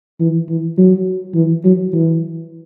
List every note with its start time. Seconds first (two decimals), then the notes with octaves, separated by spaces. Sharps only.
0.20 E3
0.49 E3
0.78 F#3
1.35 E3
1.64 F#3
1.93 E3